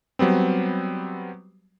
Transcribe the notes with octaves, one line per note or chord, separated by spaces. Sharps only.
F#3 G3 B3 C4